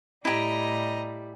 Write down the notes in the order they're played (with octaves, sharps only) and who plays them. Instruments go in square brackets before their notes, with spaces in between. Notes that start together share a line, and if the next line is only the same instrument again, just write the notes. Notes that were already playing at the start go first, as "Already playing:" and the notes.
[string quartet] A2 G3 [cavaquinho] E4 G4 [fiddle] D#5 A#5